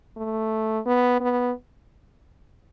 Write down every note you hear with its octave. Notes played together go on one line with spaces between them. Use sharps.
A3
B3
B3